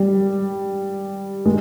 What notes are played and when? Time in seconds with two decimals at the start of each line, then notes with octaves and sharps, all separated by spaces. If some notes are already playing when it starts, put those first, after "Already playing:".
Already playing: G3
1.46 G#3